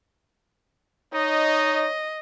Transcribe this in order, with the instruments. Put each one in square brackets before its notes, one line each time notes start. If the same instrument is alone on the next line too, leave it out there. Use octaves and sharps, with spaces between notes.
[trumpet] D#4 [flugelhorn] C#5 [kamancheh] D#5